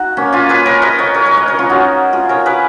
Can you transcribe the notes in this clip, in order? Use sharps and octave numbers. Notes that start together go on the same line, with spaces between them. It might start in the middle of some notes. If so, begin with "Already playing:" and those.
Already playing: D#4 F#4
A#3 C#4
C#4 F4
G#4 B4
A#4 C#5
B4 D#5
A#4 C#5
A#4 C#5
A#4 C#5
B4 D#5
A#4 C#5
C#4 F4
D#4 F#4
F4 G#4
A#4 C#5
G#4 B4